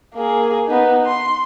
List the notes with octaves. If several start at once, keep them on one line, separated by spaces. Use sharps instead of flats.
A#3 G#4
B3 D#4
C6